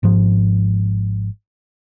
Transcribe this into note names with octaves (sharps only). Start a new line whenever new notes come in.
G#1 G#2 F3